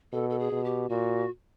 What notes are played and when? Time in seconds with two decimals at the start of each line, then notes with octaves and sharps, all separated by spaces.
0.12 B2 A4
0.30 A4
0.39 G#4
0.52 B2
0.64 G4
0.89 A#2 F#4